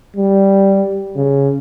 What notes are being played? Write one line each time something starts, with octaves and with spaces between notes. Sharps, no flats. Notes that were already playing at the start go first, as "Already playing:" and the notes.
G3
C#3